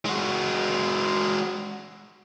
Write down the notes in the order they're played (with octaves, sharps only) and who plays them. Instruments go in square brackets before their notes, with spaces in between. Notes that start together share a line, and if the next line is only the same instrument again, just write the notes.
[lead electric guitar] G#3 F#4